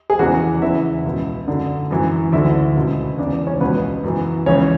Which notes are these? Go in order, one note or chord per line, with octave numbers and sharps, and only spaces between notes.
G#4
E2 C#3 E3 F#4
E2 C#3 E3 E4 E5
C#2 B2
F#2 D3
F#2 E3
D2 D3 E4 E5
C#2 B2
E2 C#3 E3 D4 D5
C#4 C#5
C#2 B2 B3 B4
F#2 E3
C#2 C#3 E3 C#4 C#5